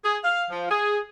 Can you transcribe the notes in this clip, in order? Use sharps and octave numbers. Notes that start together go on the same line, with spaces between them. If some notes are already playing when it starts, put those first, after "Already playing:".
G#4
F5
F3
G#4